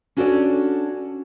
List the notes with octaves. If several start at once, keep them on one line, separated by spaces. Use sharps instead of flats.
C#4 D4 F#4 A4 C#5 D5